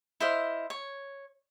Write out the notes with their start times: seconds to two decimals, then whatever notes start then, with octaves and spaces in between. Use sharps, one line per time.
0.20 E4 C5 D#5 F5
0.70 C#5